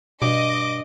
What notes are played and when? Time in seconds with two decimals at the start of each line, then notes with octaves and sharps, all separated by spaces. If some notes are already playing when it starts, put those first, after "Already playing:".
0.22 G2 B2 D#5 D6